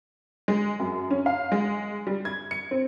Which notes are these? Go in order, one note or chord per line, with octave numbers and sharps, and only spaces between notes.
G#3
F#2
C#4
F5
G#3
G3
G#6
C#7
C4